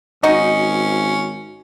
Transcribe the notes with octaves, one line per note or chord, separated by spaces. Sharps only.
G#1 C#4 D#4 F#4 D#5